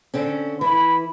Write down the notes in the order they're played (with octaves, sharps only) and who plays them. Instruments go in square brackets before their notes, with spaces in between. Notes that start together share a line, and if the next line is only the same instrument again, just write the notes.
[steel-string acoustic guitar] D3 C4 C#4
[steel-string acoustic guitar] E3 E4 [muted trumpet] B5